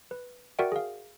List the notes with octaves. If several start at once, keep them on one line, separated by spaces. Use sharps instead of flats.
B4
F#4 A#4 D5 E5 F#5 G5
G#4 F5